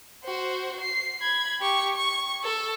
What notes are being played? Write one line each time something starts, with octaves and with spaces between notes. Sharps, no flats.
F#4 C5
C7
B5 G#6
G4 C#6
C#6
A4